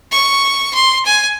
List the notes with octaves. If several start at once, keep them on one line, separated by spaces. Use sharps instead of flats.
C#6
C6
G#5